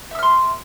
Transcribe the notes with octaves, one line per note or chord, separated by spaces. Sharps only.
E5 C6 E6 F6